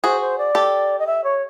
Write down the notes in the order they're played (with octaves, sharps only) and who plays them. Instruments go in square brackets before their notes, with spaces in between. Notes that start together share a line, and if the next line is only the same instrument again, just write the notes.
[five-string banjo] F#4 G#4 [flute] C5
[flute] C5
D5
[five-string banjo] G4 A4
[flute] D#5
E5
C#5